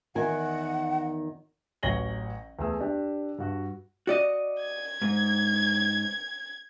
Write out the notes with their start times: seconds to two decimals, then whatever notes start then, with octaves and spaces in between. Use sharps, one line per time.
0.15 E2 D#3 F#5 G#5
1.83 A1 F#3 C#5 A#6 F#7 G7
2.59 E2 A3 G#4 E6
2.80 D4 G4
3.38 G2 F#4
4.07 F#4 D5 D#5
4.61 G#6
5.02 G#2